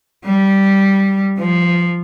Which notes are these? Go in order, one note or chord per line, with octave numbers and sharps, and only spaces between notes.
G3
F3